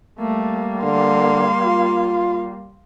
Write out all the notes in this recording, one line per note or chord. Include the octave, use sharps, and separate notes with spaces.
G3 A3 A#3
D3 F5 C6
F4